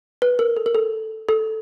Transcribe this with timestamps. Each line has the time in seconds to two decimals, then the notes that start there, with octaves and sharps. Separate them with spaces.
0.22 B4
0.39 A#4
0.57 A4
0.66 A#4
0.75 A4
1.29 A4